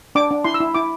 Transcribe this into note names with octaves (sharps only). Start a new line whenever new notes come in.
D4 D6
D4
E4 C6
E6
E4
E4 D6